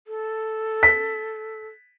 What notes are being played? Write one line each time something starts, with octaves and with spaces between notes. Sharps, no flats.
A4
B6